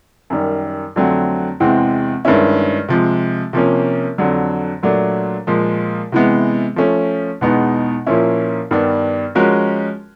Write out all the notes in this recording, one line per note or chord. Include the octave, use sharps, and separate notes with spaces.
F#2 D#3 G3
F2 D3 F#3 A3 C4
E2 C3 E3 G#3 C4
G2 D#3 G#3 C#4 E4
C3 F3 G#3
C3 F3 A#3 C#4
F2 D3 F#3
A#2 F#3 A3 D4
A#2 F3 G#3
C3 E3 G#3 B3
F3 A3 C#4
E2 B2 G#3 B3 D#4
A#2 F3 A#3 C#4 E4
G2 D#3 G3 B3 D4
F3 G#3 C#4 F#4 A#4